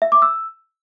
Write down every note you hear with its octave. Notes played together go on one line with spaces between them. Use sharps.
E5
D6
E6